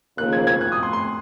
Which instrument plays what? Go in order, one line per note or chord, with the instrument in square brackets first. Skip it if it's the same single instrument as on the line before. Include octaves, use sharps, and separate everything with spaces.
[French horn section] D#2 C#3 F3 A#3 [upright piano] F#6
[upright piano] G#6
G#6
F#6
D#6
C6
C6